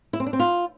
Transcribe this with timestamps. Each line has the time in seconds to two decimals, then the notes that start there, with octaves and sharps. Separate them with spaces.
0.13 E4
0.20 C4
0.26 D4
0.33 C4
0.39 F4